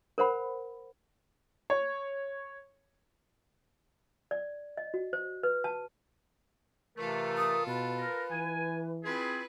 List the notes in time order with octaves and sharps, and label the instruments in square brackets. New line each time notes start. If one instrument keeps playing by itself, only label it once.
[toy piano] A#4 C5 F#5 B5
[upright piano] C#5
[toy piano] D5
D#5
F#4
C5
B4
A5
[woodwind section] C3 E3 A3 [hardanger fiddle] F4 A4 [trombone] A#4
[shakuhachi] D#6
[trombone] B2 [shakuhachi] B4
[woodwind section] A#4
[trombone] E3 [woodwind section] G#5
[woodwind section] C4 F4 G#4 [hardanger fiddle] E4 B4